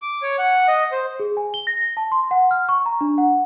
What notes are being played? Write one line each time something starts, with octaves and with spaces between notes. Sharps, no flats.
D6
C#5
F#5
D#5
C5
G#4
G#5
G7
A#6
A5
C6
F#5
F6
C#6
A#5
D4
F#5